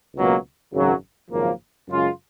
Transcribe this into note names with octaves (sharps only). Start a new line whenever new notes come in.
C#2 B2 F#3 A#3
G#1 F#2 C#3 F#3
G#1 F#2 C#3 F3 A#3
F#2 C#3 G#3 C#4 F4